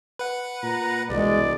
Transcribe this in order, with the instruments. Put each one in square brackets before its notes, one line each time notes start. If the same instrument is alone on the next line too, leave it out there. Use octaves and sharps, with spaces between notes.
[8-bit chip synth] B4 F#5
[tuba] A#2 [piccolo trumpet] A#5
[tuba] E1 [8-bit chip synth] C2 [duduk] G#3 [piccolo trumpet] D5